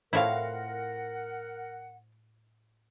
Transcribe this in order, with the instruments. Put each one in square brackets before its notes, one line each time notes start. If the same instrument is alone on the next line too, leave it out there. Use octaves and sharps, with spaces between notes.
[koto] A2 E4 [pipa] F3 C4 F5 [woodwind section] A#4 F#5